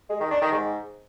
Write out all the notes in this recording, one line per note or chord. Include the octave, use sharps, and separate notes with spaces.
G#3
D#3
D4
D#3
G#2